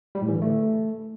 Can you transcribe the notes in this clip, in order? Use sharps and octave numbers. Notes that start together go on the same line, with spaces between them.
G3
A2
E3
D3
A3